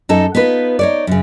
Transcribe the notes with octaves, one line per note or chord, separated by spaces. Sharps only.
F#2 D#4 A4
B3 D#4 F4 B4
D#4 C#5 D5
F#2 C#3